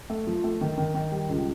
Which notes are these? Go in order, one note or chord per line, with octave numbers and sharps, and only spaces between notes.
A3
F3
A3
D#3
D#3
D#3
G3
C#2